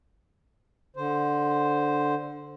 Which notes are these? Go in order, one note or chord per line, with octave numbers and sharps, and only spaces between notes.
D3 C5